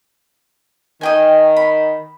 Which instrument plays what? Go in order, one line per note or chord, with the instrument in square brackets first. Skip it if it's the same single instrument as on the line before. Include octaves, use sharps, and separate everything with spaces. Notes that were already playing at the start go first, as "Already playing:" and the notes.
[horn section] D#3 [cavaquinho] D#5 G5 G#5
[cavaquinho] B5